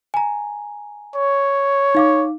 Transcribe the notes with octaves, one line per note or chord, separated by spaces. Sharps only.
G#5 A#5
C#5
D#4 F5 D6